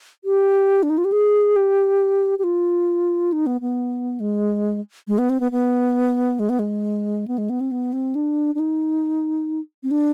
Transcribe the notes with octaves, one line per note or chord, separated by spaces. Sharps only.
G4
D4
D#4
F4
G4
G#4
G4
G4
F4
D#4
B3
B3
G#3
G#3
B3
C4
B3
B3
G#3
B3
G#3
B3
G#3
B3
C4
B3
C4
D4
D4
D#4
C4
D4